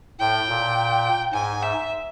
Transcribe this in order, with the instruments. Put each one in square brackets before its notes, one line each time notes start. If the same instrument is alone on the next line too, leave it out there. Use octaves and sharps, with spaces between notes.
[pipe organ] A2 [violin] G5
[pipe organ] A#2
[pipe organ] G#2 [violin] G#5
[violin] E5